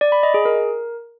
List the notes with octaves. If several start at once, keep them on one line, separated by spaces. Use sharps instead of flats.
D5
B5
D#5
G#4
A#4